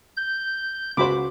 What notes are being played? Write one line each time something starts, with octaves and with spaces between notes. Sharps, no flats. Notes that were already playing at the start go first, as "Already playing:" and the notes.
G6
C#2 F#4 C5 B5 D6